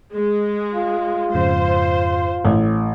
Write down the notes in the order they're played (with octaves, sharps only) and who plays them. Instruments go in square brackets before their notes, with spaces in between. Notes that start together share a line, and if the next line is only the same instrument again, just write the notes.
[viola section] G#3
[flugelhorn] F4
[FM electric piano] F2 G#2 C#3 [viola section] C5
[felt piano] A1 [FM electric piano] A3